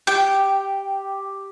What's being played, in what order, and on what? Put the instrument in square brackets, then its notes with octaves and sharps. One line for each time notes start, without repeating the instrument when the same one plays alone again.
[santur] G4 [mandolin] G5